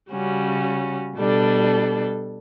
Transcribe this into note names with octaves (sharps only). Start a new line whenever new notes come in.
C#3 G3 C#4 F#4
B2 G3 D4 A4